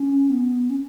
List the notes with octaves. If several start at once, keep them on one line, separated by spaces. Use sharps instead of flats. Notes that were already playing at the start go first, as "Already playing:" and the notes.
Already playing: C#4
B3
C#4